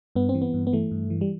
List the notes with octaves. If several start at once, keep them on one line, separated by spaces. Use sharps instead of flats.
G2 B3
C4
E3
B3
G2
B3
E3 A3
G2
E3
G3